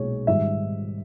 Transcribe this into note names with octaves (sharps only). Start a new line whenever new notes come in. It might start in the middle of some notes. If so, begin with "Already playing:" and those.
Already playing: B1 A#2 G#3 C#5
G#2 D#3 G3 E5